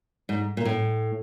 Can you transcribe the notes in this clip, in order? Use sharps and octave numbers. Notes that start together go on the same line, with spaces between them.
G#2
A#2
A2